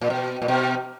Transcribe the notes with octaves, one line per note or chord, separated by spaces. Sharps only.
A#2
B2
A#2
B2